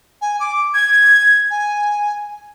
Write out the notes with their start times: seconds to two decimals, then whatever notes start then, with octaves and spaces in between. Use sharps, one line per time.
0.22 G#5
0.40 D6
0.74 G#6
1.51 G#5